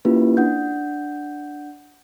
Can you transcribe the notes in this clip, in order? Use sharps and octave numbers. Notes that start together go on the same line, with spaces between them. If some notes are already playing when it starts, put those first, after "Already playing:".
A#3 C#4 E4 F4 G4 B4
D4 F#5 G6